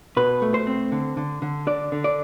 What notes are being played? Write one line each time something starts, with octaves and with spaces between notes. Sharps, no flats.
B2 B4
A3
C5
C4
D3
D3
D3
D4 D5
D3
D5